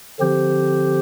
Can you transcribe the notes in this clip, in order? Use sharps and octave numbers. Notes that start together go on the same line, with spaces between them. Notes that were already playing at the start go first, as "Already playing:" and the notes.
D3 F3 C4 G4 C5